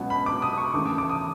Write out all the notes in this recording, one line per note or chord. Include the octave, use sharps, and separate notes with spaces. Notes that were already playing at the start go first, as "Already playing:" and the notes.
Already playing: C#2 B2 F#3 B3
B5
D6
D#6
C#6
D#2 C#3 E3 A3 D6
D6
D6
D#6